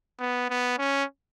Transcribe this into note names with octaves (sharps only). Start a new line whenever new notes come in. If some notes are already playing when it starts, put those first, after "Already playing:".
B3
B3
C#4